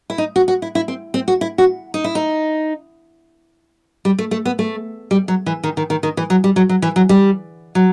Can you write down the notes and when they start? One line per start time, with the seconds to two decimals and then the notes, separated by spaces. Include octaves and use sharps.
0.10 E4
0.18 D#4
0.36 F#4
0.48 F#4
0.62 E4
0.75 E4
0.88 C4
1.14 C4
1.28 F#4
1.41 E4
1.58 F#4
1.94 D#4
2.04 E4
2.15 D#4
4.05 G3
4.18 A3
4.31 A3
4.45 B3
4.59 A3
5.11 G3
5.28 F#3
5.46 E3
5.64 D#3
5.77 D#3
5.90 D#3
6.03 D#3
6.17 E3
6.30 F#3
6.44 G3
6.56 F#3
6.69 F#3
6.82 E3
6.96 F#3
7.09 G3
7.75 F#3